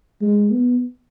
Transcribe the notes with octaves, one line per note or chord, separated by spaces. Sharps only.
G#3
B3